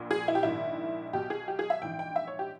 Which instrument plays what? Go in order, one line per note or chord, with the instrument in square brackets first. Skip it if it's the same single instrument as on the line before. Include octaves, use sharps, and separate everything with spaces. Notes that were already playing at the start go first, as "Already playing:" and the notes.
Already playing: [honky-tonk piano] A#1 A#2
G#4
E4
G4
A#1 G#2 D#3 E4
B1 B2 G4
G#4
G4
G#4
E5
A#1 G#2 E3 G5
G5
E5
C#5
G4